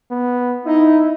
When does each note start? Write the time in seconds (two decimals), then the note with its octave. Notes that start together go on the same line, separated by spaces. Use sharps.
0.11 B3
0.66 D#4 E4